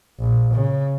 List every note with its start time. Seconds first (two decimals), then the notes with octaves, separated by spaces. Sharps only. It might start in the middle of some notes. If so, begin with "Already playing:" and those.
0.19 A#1
0.54 C#3